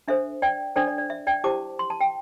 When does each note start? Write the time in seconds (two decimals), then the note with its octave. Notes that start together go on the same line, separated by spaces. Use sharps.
0.08 D4 A4 C5 E5
0.42 D5 G5
0.76 D4 A4 C5 D5 G5
0.87 D5
0.98 D5
1.10 E5
1.27 D5 G5
1.44 E4 G4 C5 A5 D6
1.79 C6
1.90 A5
2.01 G5